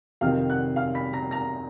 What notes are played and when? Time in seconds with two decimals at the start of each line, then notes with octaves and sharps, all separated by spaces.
0.21 F2 C3 D#3 F5 F6
0.50 F#5 F#6
0.76 F5 F6
0.94 B5 B6
1.13 A#5 A#6
1.31 A#5 A#6